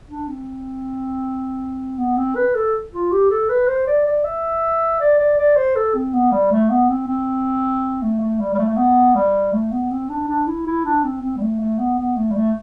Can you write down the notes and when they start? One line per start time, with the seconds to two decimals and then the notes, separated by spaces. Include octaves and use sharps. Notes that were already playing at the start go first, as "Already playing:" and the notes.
0.09 D4
0.28 C4
1.98 B3
2.17 C4
2.36 B4
2.55 A4
2.92 F4
3.12 G4
3.30 A4
3.49 B4
3.68 C5
3.87 D5
4.06 D5
4.24 E5
5.00 D5
5.19 D5
5.38 D5
5.56 C5
5.76 A4
5.95 C4
6.13 B3
6.32 G3
6.51 A3
6.70 B3
6.89 C4
7.08 C4
8.02 A3
8.20 A3
8.40 G3
8.54 G3
8.58 A3
8.69 A3
8.77 B3
9.15 G3
9.53 A3
9.72 B3
9.91 C4
10.09 D4
10.28 D4
10.47 E4
10.67 E4
10.85 D4
11.04 C4
11.22 C4
11.37 G3
11.41 A3
11.60 A3
11.79 B3
11.99 B3
12.17 A3
12.30 G3
12.36 A3